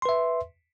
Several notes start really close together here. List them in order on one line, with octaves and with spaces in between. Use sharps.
C6 B4 E5